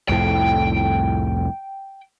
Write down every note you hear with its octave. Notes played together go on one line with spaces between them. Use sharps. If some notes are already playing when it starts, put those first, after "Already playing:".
C2 F2 A2 G5